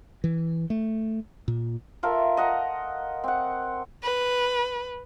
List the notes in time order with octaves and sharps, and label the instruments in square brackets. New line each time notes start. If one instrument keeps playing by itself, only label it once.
[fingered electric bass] E3
A3
A#2
[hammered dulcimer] F4 A4 A#4 E5
D#5 F#5 A#5
C4 F#5
[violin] B4